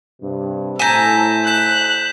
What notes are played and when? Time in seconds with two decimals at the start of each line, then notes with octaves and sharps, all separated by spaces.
0.22 G2 C3
0.79 A2 A4 C5 G#5 A#5 G6 B6 E7
1.47 F#6 G6 B6 E7